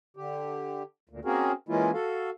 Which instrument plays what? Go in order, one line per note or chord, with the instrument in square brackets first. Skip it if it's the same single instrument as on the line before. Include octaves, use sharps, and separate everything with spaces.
[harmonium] D3 G4
D2 A#2
A#3 C4 C#4 F#4 G#4 A#4
E3 G#3 A#3 C#4 E4 F4
F#4 A4 F5